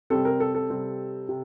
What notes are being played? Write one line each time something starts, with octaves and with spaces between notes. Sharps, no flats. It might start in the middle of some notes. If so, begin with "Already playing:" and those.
C3 G3 C4 A4
A#4
A4
A4
C3 G3 C4
C3